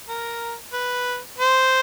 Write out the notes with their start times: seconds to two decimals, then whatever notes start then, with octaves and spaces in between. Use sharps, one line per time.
0.09 A#4
0.73 B4
1.38 C5